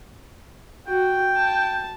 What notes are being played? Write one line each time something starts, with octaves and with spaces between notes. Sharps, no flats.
F#4 G5
A5